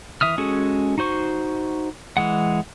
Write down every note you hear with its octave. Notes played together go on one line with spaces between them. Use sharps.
E3 E5 D#6 F6
G#3 C#4 F#4 G#4 A4
D#4 F#4 C5 C#6
E3 G#3 F#5